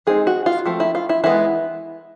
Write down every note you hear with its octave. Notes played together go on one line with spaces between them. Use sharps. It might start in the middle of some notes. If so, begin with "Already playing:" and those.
G#3 C4 D#4 G#4
F#4
F4
F3 A3 C4
E4
F4
E4
E3 G#3 B3 E4